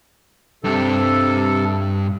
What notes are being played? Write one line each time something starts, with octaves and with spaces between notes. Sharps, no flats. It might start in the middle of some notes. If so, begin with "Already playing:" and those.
G2 C3 D4 A4